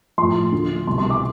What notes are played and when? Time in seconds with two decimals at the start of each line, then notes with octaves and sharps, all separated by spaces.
0.18 A2 F3 C6
0.52 D2 D3 F3
0.87 C2 B2 G3 C6
0.98 C6
1.10 D6